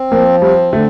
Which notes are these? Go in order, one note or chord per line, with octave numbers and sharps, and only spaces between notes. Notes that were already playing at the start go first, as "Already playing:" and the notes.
Already playing: C4
F3 A#3
G3 C4
D3 A3